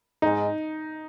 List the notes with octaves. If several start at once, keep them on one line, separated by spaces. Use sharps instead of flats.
G#2 D#4